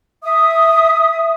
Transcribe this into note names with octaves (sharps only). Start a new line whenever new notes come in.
E5 D#6